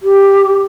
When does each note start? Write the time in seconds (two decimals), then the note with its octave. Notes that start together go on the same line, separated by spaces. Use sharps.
0.03 G4